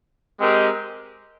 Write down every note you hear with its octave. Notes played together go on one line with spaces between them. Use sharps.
G#3 C4 G4 A#4 D#5